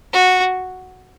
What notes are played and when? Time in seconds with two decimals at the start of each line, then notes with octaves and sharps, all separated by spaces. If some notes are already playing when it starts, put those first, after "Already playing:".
0.13 F#4